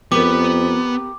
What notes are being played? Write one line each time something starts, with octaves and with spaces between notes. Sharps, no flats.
F2 B3 G4 A#4 D6